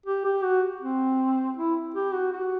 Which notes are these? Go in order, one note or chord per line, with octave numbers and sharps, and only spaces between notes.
G4
G4
F#4
C4
E4
G4
F#4
F#4